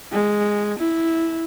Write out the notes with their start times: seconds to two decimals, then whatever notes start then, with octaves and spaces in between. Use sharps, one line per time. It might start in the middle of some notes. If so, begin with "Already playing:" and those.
0.12 G#3
0.79 E4